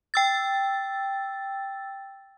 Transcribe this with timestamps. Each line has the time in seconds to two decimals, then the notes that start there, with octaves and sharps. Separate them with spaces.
0.14 G5 E6 A6